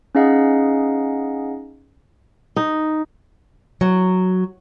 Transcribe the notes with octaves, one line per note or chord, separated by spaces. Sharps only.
C#4 D#4 G#4 D#5 F5 F#5
D#4
F#3